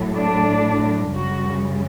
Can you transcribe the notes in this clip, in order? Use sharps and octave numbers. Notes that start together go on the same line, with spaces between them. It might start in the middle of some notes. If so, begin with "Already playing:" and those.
Already playing: A2 F#3 A3
D4
F#2 C#3 G3 F#4